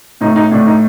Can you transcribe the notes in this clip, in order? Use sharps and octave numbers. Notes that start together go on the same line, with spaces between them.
A2 D#4
D#4
A2 D4
D#4